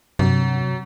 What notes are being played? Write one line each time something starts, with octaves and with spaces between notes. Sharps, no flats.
G2 C3 F#3